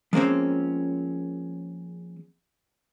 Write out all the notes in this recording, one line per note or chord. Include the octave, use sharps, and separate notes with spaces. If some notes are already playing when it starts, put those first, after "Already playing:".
F3 G#3 A#3 C4 C#4